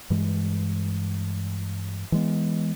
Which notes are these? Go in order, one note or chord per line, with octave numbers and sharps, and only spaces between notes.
G2 E3 G#3
E3 G#3 B3